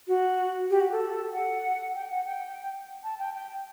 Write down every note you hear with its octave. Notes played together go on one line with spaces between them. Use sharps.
F#4
G4
F#4
A4
F#5
G5
F#5
G5
A5
G5
G5